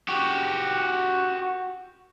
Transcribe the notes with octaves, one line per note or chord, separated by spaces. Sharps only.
F#4 G4